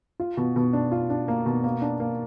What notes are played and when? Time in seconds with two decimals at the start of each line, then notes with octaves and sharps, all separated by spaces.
0.20 F4
0.37 B2
0.56 B2
0.73 D4
0.92 F4
1.10 D4
1.28 A#3
1.46 B2
1.64 A#3
1.82 D4
2.00 A#3